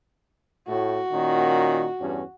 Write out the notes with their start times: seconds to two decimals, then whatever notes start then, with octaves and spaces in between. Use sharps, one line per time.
0.68 A2 F#4
1.12 A#2 D#3 C#4
2.01 E2 G2 C#4